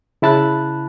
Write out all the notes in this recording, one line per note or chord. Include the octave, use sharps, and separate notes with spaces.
C#3 E4 A5 B5 F#6 A6